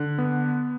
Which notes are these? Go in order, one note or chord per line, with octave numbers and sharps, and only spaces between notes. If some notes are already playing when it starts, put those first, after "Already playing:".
Already playing: D3 F#6
B3